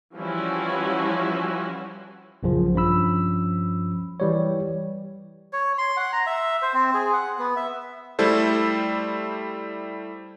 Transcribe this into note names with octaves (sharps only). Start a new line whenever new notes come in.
E3 F3 G3 C#4 E4 F#4
A#1 F#2 C#3 F3
G2 F3 C#4 B5 E6
E3 G3 C#5
C#5
C6
F#5
A#5
E5
C5
C4
G#4
F#5
B3
E5
G3 A3 E4 A4 C5